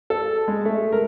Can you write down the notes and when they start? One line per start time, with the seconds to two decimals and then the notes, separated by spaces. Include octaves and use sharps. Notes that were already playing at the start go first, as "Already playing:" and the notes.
0.10 A4
0.48 G#3
0.65 A3
0.92 A#4